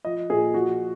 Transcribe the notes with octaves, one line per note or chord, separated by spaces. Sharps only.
F3 D#5
A#2 G#4
F3 F#4